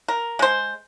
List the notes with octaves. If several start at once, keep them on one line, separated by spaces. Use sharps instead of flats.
A#4
G#3 C5